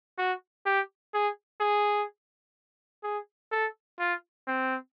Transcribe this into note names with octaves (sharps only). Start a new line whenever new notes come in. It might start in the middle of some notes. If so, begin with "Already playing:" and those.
F#4
G4
G#4
G#4
G#4
A4
F4
C4